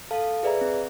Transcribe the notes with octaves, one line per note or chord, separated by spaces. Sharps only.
A4 F5 A5
G#4 B4 D5 E5 A#5
C4